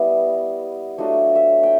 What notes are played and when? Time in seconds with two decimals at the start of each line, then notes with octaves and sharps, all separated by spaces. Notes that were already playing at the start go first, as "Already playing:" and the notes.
Already playing: G3 B3 E4 D#5
0.98 F#3 A3 D4 F4 D#5
1.35 E5
1.63 G5